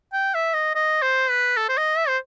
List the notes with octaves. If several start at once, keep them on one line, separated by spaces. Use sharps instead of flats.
G5
E5
D#5
D#5
C5
B4
A4
C5
D#5
E5
C5